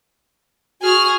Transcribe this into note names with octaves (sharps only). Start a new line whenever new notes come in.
F#4 G#4 F6